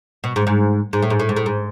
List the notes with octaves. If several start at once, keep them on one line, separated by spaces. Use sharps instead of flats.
B2
G#2
G#2
G#2
A2
G#2
A2
G#2
A2
G#2